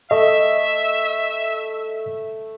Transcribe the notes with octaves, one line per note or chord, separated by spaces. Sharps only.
A3 D#5 E5